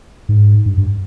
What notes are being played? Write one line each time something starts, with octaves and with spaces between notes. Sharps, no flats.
G#2
G2
G2